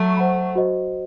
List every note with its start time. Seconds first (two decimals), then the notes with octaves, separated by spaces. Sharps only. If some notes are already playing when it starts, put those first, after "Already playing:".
Already playing: F#3 A3
0.17 C5 F#5 B5
0.55 F#4 C5 D#5